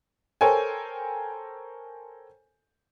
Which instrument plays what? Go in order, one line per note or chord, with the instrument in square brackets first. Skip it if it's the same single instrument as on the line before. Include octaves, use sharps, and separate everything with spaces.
[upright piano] A4 A#4 C5 C#5 G5 G#5